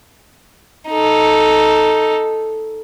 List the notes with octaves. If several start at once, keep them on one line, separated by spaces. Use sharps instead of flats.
D#4 A4